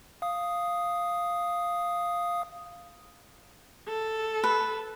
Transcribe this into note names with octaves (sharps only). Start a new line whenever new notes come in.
F5 D#6
A4
B4